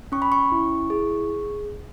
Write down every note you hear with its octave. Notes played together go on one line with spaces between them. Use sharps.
C#4 C#6
B5
C#6
E4
G#4